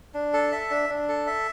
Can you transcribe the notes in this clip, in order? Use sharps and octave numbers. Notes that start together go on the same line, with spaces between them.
D4
A4
E5
D4
D4
A4
E5